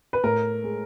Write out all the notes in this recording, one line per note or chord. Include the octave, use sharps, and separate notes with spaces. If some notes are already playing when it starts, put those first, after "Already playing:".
B4
A2 A#4
G#3